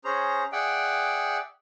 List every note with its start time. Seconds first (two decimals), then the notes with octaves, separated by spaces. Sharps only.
0.04 C#4 G#4 C5 A#5
0.52 G#4 D5 E5 F#5 G5